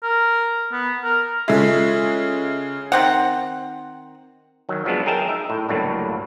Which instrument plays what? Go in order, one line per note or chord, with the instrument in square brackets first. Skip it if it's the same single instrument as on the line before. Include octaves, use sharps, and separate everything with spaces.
[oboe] A#4
B3
A#4
[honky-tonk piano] C#3 G#3 [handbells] F4 A4 E5
[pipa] D#3 C4 F#5
[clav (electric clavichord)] D#3 F#3
F3 F#3 G#3 B3 D4
G#4 A#4 E5 G5 A5
D#4 E5
A2
G1 C#2 A2 F#3 A#3 D4